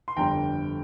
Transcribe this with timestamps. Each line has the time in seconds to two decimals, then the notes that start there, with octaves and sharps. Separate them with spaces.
0.08 C6
0.17 G1 F2 D3 G3 G5 A#5